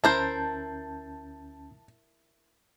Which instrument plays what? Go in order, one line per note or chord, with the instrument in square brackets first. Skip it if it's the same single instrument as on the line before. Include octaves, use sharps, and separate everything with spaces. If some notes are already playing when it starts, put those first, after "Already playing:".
[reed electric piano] D2 C#4 G6 [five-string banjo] E4 A#4 C5 [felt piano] A5